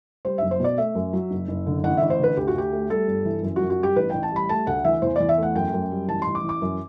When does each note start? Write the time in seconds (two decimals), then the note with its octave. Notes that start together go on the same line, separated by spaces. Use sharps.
0.25 G3 C5
0.38 F#1 E5
0.51 C5
0.60 B2 D5
0.78 A3 E5
0.95 F#2
1.13 F#3
1.31 F#1
1.48 F#1
1.66 D3
1.84 A1 F#5
1.97 A1 E5
2.10 C5
2.19 D3 B4
2.37 D2 G4
2.47 F#4
2.54 D2 G4
2.72 A3
2.90 G3 A4
3.08 G1
3.25 E3
3.43 F#2
3.56 F#2 F#4
3.70 F#4
3.79 G3 G4
3.96 A1 B4
4.10 A1 G5
4.23 A5
4.32 G3 B5
4.49 A3 A5
4.67 D2 F#5
4.84 E3 E5
5.02 E2 C5
5.16 E2 D5
5.29 E5
5.38 A3 F#5
5.55 F#2 G5
5.73 F#2
5.91 G3
6.08 A1 A5
6.22 A1 C6
6.35 D6
6.44 E3
6.49 D6
6.62 F#2